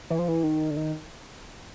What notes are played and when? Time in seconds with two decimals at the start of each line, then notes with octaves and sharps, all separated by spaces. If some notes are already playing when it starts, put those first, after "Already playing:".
0.10 E3
0.19 F3
0.28 E3
0.44 D#3
0.71 D3
0.77 D#3